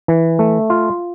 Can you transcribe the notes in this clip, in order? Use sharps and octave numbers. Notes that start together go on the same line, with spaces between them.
E3
A3
F4